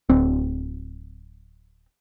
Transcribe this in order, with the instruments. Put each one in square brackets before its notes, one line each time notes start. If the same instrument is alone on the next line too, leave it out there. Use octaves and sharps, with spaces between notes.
[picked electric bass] D1 C4